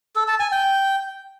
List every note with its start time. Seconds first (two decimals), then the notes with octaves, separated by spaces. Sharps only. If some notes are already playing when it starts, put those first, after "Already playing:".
0.16 A4
0.28 A5
0.40 G#5
0.52 G5